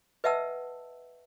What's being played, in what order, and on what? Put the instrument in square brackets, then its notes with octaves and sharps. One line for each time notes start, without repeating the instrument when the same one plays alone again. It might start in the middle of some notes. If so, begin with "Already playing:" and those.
[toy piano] B4 D#5 E5 F#5 A5 E6